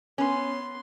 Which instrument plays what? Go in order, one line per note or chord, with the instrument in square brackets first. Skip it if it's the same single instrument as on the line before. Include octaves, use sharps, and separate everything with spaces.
[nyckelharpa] B3 C6 [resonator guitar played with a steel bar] C#4